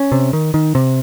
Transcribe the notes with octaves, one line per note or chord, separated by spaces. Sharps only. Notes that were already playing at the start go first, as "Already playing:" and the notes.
Already playing: C#4
C3
D#3
D#3
C3